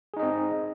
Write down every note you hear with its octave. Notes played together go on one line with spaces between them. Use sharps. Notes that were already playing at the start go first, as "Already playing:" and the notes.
C4 D#4 G#4 D#5